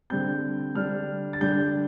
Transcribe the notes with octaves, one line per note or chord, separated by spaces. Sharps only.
D3 G3 C4 G6
D3 G3 D4 F6
A6
D3 G3 D4 G6